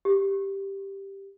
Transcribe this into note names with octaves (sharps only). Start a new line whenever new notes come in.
G4